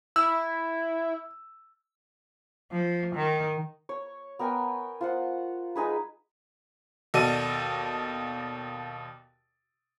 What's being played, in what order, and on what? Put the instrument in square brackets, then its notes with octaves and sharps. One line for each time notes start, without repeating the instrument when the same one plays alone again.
[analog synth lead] E4 [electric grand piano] E6
[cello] F3
D#3
[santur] C#5
B3 A#4 G5 G#5
F4 C5 F#5
G#3 D#4 G#4 B4
[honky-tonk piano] D#2 B2 A4 D5 D#5 D#7